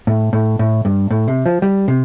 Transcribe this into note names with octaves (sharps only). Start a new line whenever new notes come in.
A2
A2
A2
G2
A2
C3
F3
G3
C3